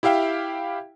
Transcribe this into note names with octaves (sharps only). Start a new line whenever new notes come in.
E4 G4 E5 F5 G5